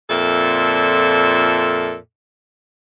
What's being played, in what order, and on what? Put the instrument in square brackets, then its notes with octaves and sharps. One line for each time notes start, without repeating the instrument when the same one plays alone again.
[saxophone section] F2 A#2 A4 E5